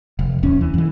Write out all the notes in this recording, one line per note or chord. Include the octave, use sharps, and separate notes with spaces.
F1
D1 E2 C#4
E3
F2 E3